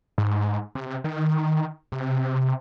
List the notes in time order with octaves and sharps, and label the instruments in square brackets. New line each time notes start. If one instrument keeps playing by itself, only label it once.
[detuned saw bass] G#2
C3
D#3
C3